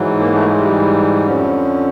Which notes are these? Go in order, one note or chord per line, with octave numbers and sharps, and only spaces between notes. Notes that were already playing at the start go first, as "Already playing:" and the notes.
Already playing: G#2 E3 F#3
A#3
A3
G#3
G3
F2 D3 F3 C#4